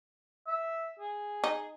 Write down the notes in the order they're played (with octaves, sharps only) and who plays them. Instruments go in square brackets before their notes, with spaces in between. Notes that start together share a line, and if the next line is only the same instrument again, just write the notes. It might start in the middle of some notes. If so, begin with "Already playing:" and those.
[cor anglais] E5
G#4
[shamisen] D#4